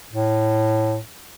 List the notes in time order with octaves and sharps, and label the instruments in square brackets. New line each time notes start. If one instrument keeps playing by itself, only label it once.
[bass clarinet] A2